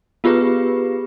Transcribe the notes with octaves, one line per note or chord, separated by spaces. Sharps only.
B3 F4 G4 G#4 B4